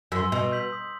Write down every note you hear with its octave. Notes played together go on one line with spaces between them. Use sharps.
F#2 C6 E6
B2 E6
G6 B6 F#7
D#6